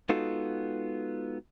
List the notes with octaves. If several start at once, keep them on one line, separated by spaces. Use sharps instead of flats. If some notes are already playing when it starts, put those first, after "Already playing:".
G#3 B3 D#4 F4 F#4 A4